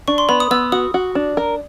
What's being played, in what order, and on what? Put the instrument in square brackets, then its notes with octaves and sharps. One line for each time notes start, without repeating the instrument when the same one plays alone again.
[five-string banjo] D4 [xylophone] C#6
[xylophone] C6
[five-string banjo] B3 [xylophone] B5
[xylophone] D#6
[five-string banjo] B3 [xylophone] E6
[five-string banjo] F#4 [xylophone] D#6
[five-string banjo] F#4
D4
A#4